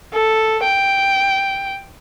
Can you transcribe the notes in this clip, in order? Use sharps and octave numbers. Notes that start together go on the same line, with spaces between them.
A4
G5